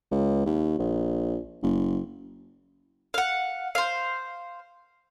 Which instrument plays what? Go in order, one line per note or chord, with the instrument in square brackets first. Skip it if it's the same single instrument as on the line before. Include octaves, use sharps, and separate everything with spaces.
[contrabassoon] C#2
D#2
A#1
F#1
[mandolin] F5 F#5
C5 F5